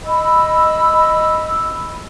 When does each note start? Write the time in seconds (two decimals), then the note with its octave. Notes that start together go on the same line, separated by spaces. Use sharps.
0.05 D#5 B5 E6